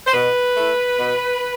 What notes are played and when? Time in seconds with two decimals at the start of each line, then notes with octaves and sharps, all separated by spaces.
0.07 C5
0.13 B2 B4
0.56 A3 E4
0.99 B2